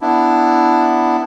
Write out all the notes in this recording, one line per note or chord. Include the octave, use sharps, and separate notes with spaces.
B3 D4 E4